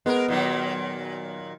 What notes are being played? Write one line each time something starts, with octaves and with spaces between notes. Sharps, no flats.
G#3 B3 A#4
A#2 D#3 F#3